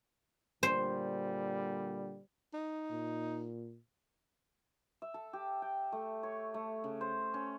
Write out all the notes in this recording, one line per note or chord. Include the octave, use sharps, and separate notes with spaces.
A#2 D3 G3 C5
D#4
A#2
E5
A4
G4
G5
A3
C#5
A3
C#3
C5
C#4